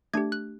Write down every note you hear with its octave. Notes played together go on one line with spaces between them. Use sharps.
A3 D4 G4 G#6
F#6